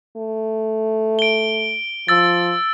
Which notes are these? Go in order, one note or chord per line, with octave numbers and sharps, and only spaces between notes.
A3
D7 G7
F3 E6 A6